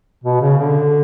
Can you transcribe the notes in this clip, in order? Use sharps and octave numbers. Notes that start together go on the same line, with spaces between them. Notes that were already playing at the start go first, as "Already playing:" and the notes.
B2
C#3
D3